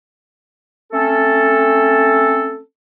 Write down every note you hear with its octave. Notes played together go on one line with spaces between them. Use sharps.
A3 C4 C#4 A4